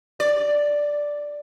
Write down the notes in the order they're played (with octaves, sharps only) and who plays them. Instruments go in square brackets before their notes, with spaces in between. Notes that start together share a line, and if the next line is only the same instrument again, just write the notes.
[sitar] D5